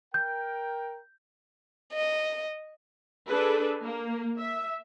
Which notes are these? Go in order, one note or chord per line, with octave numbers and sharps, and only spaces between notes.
A#4 G5 G6
D#5
D4 G#4 A4 B4
A#3
E5